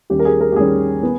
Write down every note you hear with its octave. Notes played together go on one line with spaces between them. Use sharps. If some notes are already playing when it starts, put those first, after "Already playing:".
D#2 D#3 G3 C#4 G4
A#4
G#4
A#4
G4
D#2 D#3 G3 C#4 G#4
B3